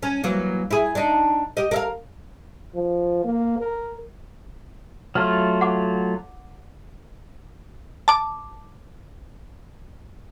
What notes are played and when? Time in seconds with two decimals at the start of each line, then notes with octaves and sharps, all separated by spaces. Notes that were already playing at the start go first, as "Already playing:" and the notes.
0.03 C#4
0.23 E3 F#3 A#3
0.71 E4 G#4
0.95 D4 D#4
1.57 G4 D#5
1.71 A#4 E5 F5
2.75 F3
3.24 A#3
3.59 A#4
5.15 F#3 A3 F4 F6
5.61 F#5 D6
8.08 A5 D6